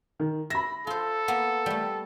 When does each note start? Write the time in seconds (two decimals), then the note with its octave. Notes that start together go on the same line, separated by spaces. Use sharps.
0.19 D#3
0.50 E5 B5 A#6
0.87 F4 A4 C5
1.28 A#3 B3
1.66 G3 A3